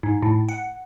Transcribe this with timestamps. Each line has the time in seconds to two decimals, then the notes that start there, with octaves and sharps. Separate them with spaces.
0.03 G#2
0.22 A2
0.49 F#5